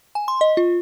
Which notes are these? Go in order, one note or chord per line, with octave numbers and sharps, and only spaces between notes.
G#5
C6
D#5
F4